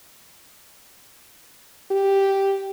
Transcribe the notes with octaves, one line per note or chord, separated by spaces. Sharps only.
G4